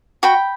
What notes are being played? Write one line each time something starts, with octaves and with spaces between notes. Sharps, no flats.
F#4 G5 B5